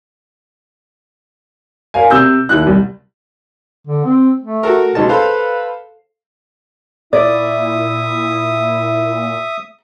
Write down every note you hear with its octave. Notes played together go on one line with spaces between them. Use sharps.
A#4 F5 G#5
C3 E6 G6
D#2 E4 F#6
C2
D3
C4
A3
F#4 A4 A#4
C#2 B2 D#4 A5
A4 B4 C5 F5
A#2 E4 D5 E5 D#6